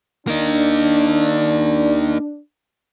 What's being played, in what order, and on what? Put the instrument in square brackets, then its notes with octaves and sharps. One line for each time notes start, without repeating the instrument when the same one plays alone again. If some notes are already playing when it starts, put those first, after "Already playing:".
[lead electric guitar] A#3 D#4 [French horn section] D4